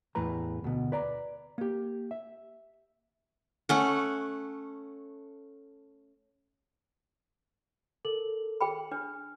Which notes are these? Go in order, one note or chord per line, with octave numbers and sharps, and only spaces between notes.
E2 A2 B4 A#5
D2 B2
B4 D5 A#5
A#3 G4
E5
A3 C#4 F#5
A4 A#4 F#7
G#4 G5 B5
D4 F6